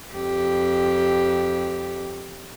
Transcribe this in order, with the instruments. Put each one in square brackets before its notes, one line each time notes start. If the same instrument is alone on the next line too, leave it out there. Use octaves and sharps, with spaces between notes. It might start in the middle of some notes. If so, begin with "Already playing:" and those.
[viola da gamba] F2 G4